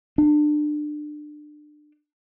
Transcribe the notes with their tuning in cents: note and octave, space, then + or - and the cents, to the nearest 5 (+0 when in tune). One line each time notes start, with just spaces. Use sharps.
D4 +25